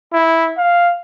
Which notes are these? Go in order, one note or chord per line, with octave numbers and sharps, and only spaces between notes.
E4
F5